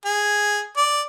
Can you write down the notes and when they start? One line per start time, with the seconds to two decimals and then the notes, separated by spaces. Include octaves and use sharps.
0.06 G#4
0.77 D5